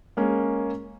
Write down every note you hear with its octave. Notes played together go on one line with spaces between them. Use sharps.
G#3 A#3 C#4